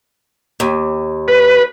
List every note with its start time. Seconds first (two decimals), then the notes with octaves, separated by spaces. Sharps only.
0.60 D#2
1.28 B4